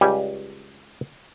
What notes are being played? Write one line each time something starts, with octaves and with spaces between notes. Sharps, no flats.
C#2 G3 G4 G#5